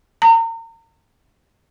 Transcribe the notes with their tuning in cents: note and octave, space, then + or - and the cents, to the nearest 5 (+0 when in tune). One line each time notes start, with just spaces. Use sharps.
A#5 -35